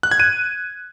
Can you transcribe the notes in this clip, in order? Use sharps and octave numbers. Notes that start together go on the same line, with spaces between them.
F#6
G#6
D#7